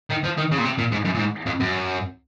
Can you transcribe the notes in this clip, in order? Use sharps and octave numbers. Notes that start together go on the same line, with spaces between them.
D#3
F3
D#3
C#3
A#2
C3
A#2
G#2
F#2
A#2
G#2
F2
F#2